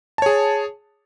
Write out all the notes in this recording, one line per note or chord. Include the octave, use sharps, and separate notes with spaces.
G#4 C#5 A5